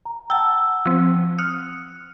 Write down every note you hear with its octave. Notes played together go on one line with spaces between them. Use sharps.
A#5
F#5 G5 A5 E6
F3 C4
D#6 F6 F#6 C#7